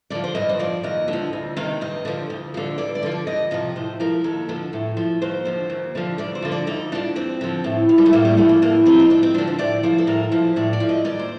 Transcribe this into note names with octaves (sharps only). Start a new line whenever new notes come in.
D3 F3 D5
C5
G2 D#5
C5
F3 D5
D#2 D#5
D3
F3
D2
C3 D#3
G2 D#5
D3 F3
D2
D3 F3
G2 D5
D5
D3 F3
D5
F2 D#5
C3 F3 D#5
A2 C5
F3 A#4
D#2 A4
D3 F3
A2
F3
D#2 C5
D3 F3
D#2
D3 F3
D2 D5
C5
D3 F3
D5
D2 D#4
D3 F3 D4
F2 C4
D3 F3
A2
F3
G3
A3
A2 A#3
G3
F3 A3
A#3
A2 A#3
F3 C4
D#4
F2 D4
C4
D3 F3 D4
C5
A2 D5
F3 C5
A4
A2 A#4
F3 C5
A2 D5
D5
F3
D#5
D#2 D5
C5